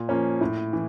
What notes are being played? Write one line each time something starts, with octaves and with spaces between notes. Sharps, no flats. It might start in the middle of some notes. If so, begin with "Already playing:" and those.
Already playing: A#2
F3 A#3 C#4
A2
E3